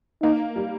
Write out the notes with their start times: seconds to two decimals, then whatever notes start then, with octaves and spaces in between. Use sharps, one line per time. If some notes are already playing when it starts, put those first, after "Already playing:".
0.22 A#3 D#4
0.56 G3